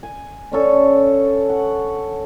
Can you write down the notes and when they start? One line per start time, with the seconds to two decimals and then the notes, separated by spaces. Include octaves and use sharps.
0.03 G#5
0.52 D3 C#4 A4
1.49 F#5